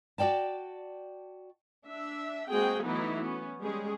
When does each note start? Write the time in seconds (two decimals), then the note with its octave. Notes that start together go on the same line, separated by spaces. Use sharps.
0.18 F#4 A4 D5 G5 A5
1.86 D4 E5
2.49 G#3 A#3 C4 F#4 G#4 G5
2.83 E3 F#3 A3 B3 D#4 E4
3.22 B3 C#4
3.60 G3 G#3 C#4 G#4